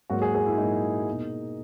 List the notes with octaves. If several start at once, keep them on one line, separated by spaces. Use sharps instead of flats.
G#2 F#3 A#3 F#4
G#4
G#4
E4
G#2 F#3 A#3 D#4
B2 A#3